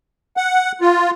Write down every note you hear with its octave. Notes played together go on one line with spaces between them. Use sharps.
F#5
F4